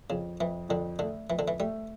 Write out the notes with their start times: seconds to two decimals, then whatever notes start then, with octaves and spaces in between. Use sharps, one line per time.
0.10 F2 C#3
0.40 F2 E3
0.69 F2 D3
0.99 D3 A3
1.30 F2 E3
1.39 D3
1.48 E3
1.60 G3 A3